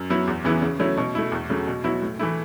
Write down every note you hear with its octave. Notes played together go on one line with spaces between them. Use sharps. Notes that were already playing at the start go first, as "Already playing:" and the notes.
Already playing: F#2
F#3 B3 E4
E2
C#3 E3 B3 E4
C#3
F#3 A3 C#4 E4
B2
A3 E4
E2
C#3 F#3 A3
B2
F#3 B3 E4
A2
E3 A3 E4